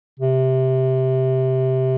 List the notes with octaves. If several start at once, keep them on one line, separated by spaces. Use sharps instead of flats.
C3